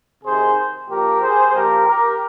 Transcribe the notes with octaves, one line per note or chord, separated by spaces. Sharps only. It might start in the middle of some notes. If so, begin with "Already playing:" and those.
C3 D#3 G#4 C5
A#2 F3 G4 A#4
G#4 C5
A#2 F3 G4 A#4
G4 A#4